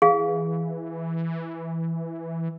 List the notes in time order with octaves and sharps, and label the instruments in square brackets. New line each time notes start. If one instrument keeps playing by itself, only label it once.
[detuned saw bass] E3 [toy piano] G#4 F5